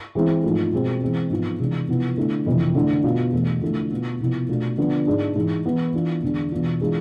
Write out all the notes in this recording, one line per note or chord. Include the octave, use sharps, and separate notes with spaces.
E3 G#3 C4 E4
G#2 F3 A3
B2 G#3 C4
E3 G#3 C4
G#2 F3 B3 F4
C3 E3 G#3 D4
C3 F3 B3 E4
D3 A3 E4
F2 C3 E3
D3 A3 E4
B2 B3 F4
E2 B2 A3
D3 F3 A3 E4
B2 B3 F4
C3 F3 B3 E4
B2 A3 D4 F4
D3 F3 B3
G#2 G#3 D4
G#2 E3 G#3
E3 B3 E4
E3 B3 D4 F4
E2 D3 G#3 D4
E2 B2 B3 D4 F4
E3 G#3 D4 F4